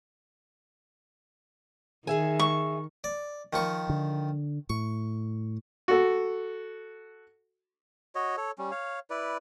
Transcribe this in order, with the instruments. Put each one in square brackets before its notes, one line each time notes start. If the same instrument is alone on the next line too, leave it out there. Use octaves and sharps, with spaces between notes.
[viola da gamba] D#3 [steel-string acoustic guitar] G#4 E5 G#5
[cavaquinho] C#6
[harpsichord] D5
D#3 F3 C#6
[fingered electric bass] D3
[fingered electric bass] A2 [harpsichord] C#6
[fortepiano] F#4 A4
[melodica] F#4 C#5 D#5
A4 C#5
G3 C#4
C#5 F5
E4 B4 D5